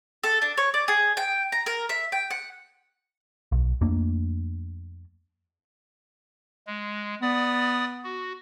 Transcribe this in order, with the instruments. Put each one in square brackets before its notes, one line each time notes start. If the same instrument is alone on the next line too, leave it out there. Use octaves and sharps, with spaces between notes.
[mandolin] A4
D4
C#5
D5
G#4
G5
A#5
A#4
E5
G5
F#5
[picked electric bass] B1
F2 A3 A#3 D4
[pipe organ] G#3
[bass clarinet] B3 [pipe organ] D5 D#6
[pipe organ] F#4